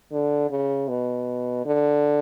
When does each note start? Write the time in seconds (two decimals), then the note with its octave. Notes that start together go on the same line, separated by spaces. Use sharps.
0.12 D3
0.51 C#3
0.88 B2
1.65 D3